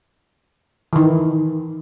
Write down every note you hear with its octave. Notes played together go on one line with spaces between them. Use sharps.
D#3 E3